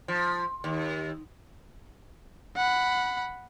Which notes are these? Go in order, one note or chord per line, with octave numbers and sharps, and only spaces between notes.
F3
D#2
F#5 B5